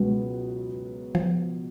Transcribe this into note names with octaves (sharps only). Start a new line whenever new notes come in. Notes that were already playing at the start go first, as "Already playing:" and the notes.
Already playing: C#2 B2 F#3 G#3 B3
F3